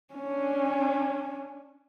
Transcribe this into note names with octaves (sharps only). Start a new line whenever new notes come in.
C#4 D4